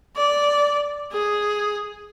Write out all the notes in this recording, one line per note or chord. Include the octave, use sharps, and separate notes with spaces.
D5
G#4